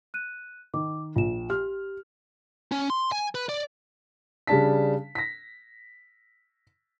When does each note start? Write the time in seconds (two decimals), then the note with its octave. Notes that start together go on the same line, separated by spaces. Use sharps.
0.14 F#6 D#7
0.74 D#3 D6
1.16 A#1 F4 E7
1.50 G4 F6
2.72 C#4
2.90 C6
3.12 G#5
3.35 B4
3.49 D5
4.47 C#3 G3 D4 A5 B6
5.15 A#6 B6